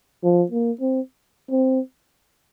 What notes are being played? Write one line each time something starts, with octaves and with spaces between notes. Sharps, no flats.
F3
A#3
C4
C4